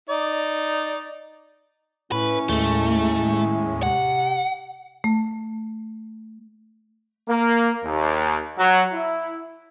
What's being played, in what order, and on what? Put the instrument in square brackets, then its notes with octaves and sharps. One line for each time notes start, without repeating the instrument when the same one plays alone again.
[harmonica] D#4 D5
[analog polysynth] A2 [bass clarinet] C#4 [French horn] E4 [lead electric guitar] B4
[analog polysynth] D#2 A2 G#3 [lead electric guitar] A3
[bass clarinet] C3 [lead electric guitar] F#5
[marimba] A3
[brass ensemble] A#3
D#2
F#3
E4